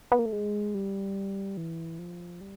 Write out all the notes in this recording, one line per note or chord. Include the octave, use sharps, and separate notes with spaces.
B3
A#3
A3
G#3
G3
E3
F3
G3